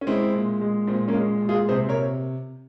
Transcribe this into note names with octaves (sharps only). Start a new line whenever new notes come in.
C#4
G#3 C4 E4
A#2
G#3
A#2 C4
A#3 C#4
G#3
A#2
F4 G#4
C3 G#4 C5
A#4 C#5